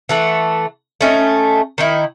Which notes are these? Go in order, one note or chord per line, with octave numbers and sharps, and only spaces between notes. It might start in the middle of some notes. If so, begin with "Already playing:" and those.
E3 A3 F#5
A3 C#4 D#4
D#3 D#4 E4